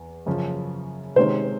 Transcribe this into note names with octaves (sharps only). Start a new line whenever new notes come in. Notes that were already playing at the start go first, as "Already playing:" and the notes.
Already playing: E2
F#2 C#3 F3
C3 D#3 G#3 C#4 C5